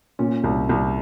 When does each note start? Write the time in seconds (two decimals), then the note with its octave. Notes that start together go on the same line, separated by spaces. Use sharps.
0.19 A#2 C#4
0.44 C2
0.69 C2